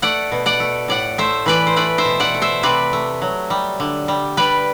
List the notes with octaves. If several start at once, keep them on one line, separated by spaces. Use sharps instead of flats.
A3 D5 F#5
B2
D5 F#5
A3
A2 D5 F#5
A3 C5 E5
E3 B4 D5
C5
A3 B4 D5
C5 E5
B2
D5 F#5
A3
C5 E5
C3 B4 D5
A3
F#3
G3
D3
G3
G3 B4 D5